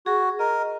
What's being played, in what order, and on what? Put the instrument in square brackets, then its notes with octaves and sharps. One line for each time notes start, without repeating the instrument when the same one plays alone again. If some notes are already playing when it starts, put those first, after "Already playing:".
[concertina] F#4 [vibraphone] G#4
[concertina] A#4 [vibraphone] D#5